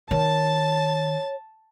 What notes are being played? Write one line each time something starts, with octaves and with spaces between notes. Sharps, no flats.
D#3 C#5 A5 A6